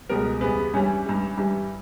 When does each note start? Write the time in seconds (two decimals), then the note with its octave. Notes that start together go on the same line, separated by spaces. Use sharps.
0.09 C#2 B2 G3 A#4
0.41 E2 C#3 G3 B3
0.74 G2 E3 G3 C#4
1.06 G2 E3 G3
1.37 G2 E3 G3